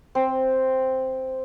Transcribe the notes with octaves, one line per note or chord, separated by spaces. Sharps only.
C4